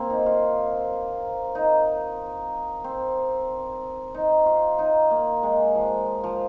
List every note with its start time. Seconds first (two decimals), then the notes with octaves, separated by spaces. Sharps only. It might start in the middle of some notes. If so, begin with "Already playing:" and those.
Already playing: A#3 C4
0.10 D#4
0.26 F4
1.55 D#4
2.84 C4
4.14 D#4
4.46 F4
4.79 D#4
5.11 A#3
5.43 G#3
5.75 F3
6.24 F3